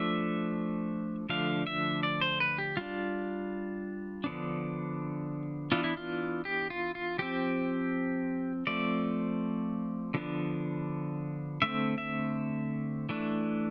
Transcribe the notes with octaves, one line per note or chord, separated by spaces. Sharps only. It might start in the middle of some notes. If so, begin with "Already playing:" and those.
Already playing: F3 A3 D4 E5
D3 F3 A3 D4 F5
E5
D5
C5
B4
G4
G3 D4 F4
D3 F3 B3 D4
E3 B3 D4 F4
E4
F4
G4
F4
F4
F3 C4 G4
F3 A3 C4 D5
D3 F3 B3 D4
D3 A3 C4 E5
E5
E3 A3 D4